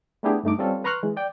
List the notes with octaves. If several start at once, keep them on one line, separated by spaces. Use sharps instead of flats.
A3 B3 D4 E4 G4 G#4
G2 A3 D#4 D6
G3 C4 C#4 F4 A4
B4 A#5 C6 C#6 F6 F#6
E3 G#3
D5 G5